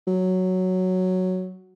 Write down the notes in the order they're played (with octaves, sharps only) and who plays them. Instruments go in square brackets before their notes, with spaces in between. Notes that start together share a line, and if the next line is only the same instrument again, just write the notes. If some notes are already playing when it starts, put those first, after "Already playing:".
[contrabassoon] F#3